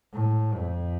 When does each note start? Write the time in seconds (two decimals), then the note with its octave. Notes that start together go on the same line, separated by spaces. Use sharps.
0.13 A2
0.55 F2